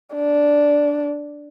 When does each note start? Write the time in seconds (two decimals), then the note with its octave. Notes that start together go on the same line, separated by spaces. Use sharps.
0.15 D4